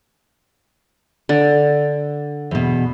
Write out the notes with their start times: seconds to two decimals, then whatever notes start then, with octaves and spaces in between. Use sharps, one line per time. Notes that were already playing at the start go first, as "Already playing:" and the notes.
1.29 D3
2.51 E2 B2